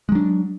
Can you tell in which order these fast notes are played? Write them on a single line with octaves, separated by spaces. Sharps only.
G#3 F#3 D4